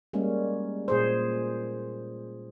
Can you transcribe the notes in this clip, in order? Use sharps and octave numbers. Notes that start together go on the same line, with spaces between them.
G3 G#3 A#3 C#4
A#2 G#4 C5